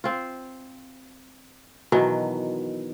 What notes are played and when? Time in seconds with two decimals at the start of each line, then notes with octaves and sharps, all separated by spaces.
0.04 C4 F4
1.92 B2 D#3 E3 F#3